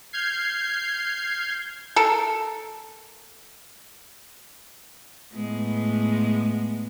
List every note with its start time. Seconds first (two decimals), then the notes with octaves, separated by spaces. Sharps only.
0.13 F6 G6 G#6 C7
1.96 A4 A#4
5.34 A2 G#3 B3